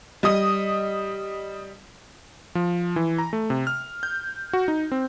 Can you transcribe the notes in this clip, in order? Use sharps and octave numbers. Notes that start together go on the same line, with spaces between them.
G3 D#5 D#6
F3
E3
A#5
A3
C3
F6
G6
F#4
D#4
C4